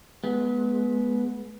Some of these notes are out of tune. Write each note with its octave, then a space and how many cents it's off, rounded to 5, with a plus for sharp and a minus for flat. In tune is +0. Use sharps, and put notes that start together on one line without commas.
G#3 +30 B3 -10